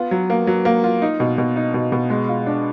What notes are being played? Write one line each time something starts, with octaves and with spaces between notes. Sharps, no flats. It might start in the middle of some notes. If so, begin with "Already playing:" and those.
Already playing: B3 F4
F#3
A#3
F#3
A#3
F4
D#4
B2
B2
D#4
B2
B2
G#3
F4
D4